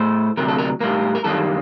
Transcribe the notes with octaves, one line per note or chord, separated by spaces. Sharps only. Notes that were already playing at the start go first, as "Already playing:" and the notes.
Already playing: A2 A3 C5
D2 C3 F#3 A#4
A4
A#4
A2 G3 A#3 A#4
A#4
F#2 D#3 G3 A#3 A4